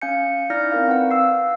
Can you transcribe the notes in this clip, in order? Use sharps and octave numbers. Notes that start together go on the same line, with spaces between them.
C#4 F5 G#5 G6 C#7
D#4 E4 D5 F6 G6 A#6
C4 A#4 F5
C4 B4 F#5
F5 E6 C7